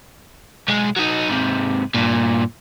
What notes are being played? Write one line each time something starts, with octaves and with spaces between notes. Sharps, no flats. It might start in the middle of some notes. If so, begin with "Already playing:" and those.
B1 G#3
F#3 D#4
G#2 C3
G2 A#2